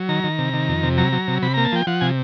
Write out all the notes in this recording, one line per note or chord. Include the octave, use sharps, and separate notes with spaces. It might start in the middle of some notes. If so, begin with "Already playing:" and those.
Already playing: F#3
D#3 A#5
D#3
C3
D#3
F2
C3
F#3 A#5
F#3
C3
C3 B5
A#3 A#5
A5
F3 G5
F3 F#5
C3 G#5